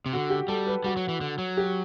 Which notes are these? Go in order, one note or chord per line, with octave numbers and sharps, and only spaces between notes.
C3
D3 F#4
G4
G3 A4
B4
G3 F#4
F#3
E3
D3
F#3
G4